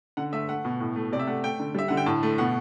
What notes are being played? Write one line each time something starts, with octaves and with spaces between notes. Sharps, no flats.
D3 F#5
A3 E5
A3 F#5
B2
A2
A3
C3 D5
E5
A3 F#5
A3 G5
D3
G3 E5
D3 F#5
G5
A2 A5
A3
B2 F#5